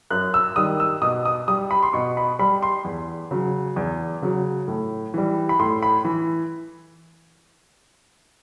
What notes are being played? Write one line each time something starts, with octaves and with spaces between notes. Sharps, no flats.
F#2 F#6
E6
D#3 G3 D#6
E6
B2 D#6
D#6
G3 D#6
B5
C6
B2 C#6
B5
G3 B5
C6
E2
C#3 F#3
E2
C#3 F#3
A2
E3 G3
B5
A2 C6
B5
E3